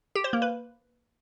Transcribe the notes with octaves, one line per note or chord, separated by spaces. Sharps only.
G4
C5
A#3
B4